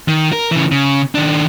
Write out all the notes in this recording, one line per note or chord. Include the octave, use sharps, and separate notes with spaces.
D#3
A#4
C#3 E3
C#3
D#3 D4